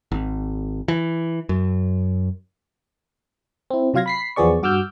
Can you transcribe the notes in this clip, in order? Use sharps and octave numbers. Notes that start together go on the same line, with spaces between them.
G#1
E3
F#2
C4 E4
C3 F#3 F4 F5 G#6 A#6
B5 B6 C7
E2 F3 B3 G#4 D5 C#6
G2 F#4 D6 E6 F6 G6